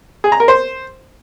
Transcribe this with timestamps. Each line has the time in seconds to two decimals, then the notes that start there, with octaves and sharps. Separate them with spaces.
0.24 G#4
0.32 A#5
0.40 A#4
0.48 C5